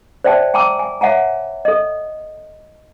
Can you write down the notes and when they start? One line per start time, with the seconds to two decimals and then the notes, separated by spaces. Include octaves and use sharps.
0.24 C5 D5 E5 G5 A5
0.54 G5 G#5 A#5 C6 D6 E6
0.79 G#5
1.01 C#5 E5 F#5 G#5 A#5
1.65 A4 D#5